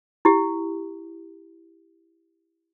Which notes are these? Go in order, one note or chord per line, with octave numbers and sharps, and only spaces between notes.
E4 G4